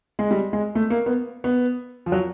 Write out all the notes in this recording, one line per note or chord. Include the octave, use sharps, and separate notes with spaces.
G#3
G3
G#3
A3
A#3
B3
B3
F3
F#3